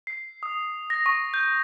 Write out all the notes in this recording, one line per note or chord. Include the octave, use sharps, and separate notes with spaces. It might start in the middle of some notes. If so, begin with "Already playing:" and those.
C7
D#6
A#6
C#6
G6